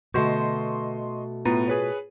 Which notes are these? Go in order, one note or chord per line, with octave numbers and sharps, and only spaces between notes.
B2 D3 A3 F#4 D#5 C6 C#6 G6
A2 B3 F4 A#5
G#4 B4 C#5